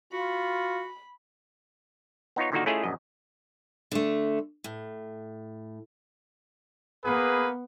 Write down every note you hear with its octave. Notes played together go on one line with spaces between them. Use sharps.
F4 F#4 B5
B3 D#4 F4 C#5
A#2 D3 D#3 A#3 D#4 F#4
A3 C#4 E4 F4 G#4 D#5
A#1 F#2 D#5
D3 A3
A2
A#3 B3 G#4 B4